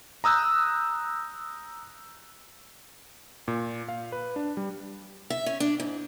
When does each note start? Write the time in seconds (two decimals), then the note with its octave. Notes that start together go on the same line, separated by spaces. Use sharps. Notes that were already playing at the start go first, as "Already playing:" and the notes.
0.24 A#5 D#6 E6 F#6 G6
3.48 A#2
3.88 F5
4.12 B4
4.36 D4
4.57 G3
5.30 E5
5.46 C#4
5.60 D4
5.80 G#2